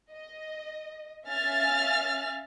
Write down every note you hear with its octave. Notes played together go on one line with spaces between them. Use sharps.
D#5
C#4 E5 F5 G#5 F6 A6